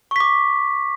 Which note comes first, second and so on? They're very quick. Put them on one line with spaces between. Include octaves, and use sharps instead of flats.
C#6 B6 D6